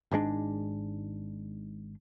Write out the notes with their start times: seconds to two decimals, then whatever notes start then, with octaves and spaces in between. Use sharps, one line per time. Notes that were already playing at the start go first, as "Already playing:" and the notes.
0.11 G#1 G#2 G#3 D4